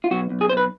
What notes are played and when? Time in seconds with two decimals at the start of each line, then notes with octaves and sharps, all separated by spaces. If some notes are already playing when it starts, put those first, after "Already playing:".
0.04 F4
0.11 B1 F#4
0.30 B1
0.41 G#4
0.49 B1 C5
0.57 B4